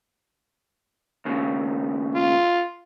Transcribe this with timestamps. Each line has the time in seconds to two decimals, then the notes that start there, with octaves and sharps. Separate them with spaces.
1.25 D#2 C#3
2.15 F4